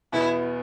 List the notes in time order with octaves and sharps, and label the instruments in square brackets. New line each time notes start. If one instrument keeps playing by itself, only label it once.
[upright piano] E2 B2 B3 [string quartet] E4